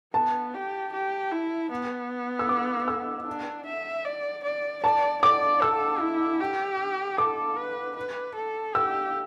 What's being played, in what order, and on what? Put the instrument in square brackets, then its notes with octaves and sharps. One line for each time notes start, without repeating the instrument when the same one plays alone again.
[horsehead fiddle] B3 [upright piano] A5
[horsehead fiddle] G4
G4
E4
B3
[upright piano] E6
D6
E6
[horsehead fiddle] D4
E5
D5
D5
[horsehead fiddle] D5 [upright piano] A5
[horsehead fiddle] D5 [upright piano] D6
[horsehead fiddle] A4 [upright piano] E6
[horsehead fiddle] E4
G4
[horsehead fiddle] A4 [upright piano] D6
[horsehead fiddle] B4
B4
A4
[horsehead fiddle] G4 [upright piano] E6